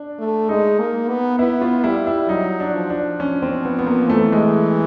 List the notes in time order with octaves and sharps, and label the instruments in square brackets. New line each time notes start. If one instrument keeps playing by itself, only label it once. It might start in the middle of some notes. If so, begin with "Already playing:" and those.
Already playing: [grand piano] D4
[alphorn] A3
[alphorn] G#3 [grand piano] D#4
[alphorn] A#3
B3
[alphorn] B3 [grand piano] E4
[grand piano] F4
[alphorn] G3 [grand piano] E4
[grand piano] E4
[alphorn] F#3 [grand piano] D#4
[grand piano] D4
[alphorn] F3
[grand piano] D4
C#4
C4
B3
B3
A#3
[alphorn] E3 [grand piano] A3
[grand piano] G#3